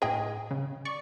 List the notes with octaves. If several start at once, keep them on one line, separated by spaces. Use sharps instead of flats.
A2 G#4 D#5 G5
C#3
D5 C#6